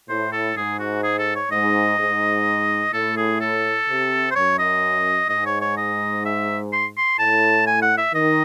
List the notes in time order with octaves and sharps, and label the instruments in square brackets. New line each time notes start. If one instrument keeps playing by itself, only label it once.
[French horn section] A2 [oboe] C5
[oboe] A4
[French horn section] G#2 [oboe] G#4
[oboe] F#4
G#4
A4
C#5
[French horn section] G#2 [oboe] D#5
[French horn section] G#2
[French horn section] A2 [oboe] A4
[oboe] G#4
A4
[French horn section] C3
[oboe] C5
[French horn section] F#2 [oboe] C#5
[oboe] D#5
[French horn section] G#2 [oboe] D#5
[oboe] C#5
C#5
D#5
E5
C6
C6
[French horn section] A2 [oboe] A5
[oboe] G#5
F#5
E5
[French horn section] D#3 [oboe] D#5